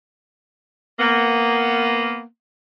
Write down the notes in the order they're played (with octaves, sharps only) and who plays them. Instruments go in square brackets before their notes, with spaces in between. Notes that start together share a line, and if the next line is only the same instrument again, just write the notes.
[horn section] A#3 B3